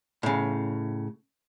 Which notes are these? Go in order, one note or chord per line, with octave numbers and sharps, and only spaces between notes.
A2 C#3